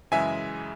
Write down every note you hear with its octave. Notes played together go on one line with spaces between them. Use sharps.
F#2 C#3 E3 G#3 E5 G#5